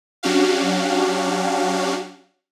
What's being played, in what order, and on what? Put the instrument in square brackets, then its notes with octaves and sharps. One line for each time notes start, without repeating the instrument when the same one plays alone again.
[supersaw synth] F#3 C#4 D4 F#4 G4 F5